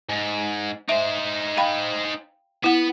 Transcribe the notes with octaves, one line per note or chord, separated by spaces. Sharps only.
G#2
D#4 C5 E5
F5 G5 B5
B3 E4 F#5